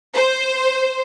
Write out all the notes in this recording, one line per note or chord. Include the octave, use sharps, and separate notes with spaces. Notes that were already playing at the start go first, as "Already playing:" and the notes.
C5